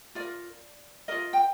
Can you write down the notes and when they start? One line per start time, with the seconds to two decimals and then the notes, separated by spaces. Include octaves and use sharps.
0.15 F4 A#4 D5
1.08 F4 A#4 D#5
1.33 G5